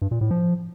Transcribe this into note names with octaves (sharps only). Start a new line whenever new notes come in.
G2
A#2
A2
F3